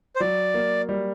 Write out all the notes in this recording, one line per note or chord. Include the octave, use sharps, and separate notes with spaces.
C5
F#3 D5
A#3
G3